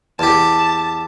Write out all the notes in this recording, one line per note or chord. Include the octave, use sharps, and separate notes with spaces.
E2 G4 A5